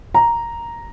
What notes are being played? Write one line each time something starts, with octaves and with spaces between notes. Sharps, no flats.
A#5